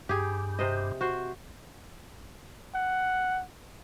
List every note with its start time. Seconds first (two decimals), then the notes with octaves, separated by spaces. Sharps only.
0.09 G2 G4 G#4
0.59 C3 C5 D#5
1.01 F#4 C5
2.75 F#5